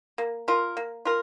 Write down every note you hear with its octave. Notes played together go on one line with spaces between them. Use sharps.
A#3
F4 A#4
A#3
F4 A#4